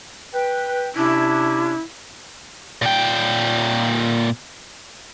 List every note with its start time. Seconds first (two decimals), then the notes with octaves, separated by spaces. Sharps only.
0.34 B4 G5
0.96 C3 C#4 D4 E4
2.82 A#2 G5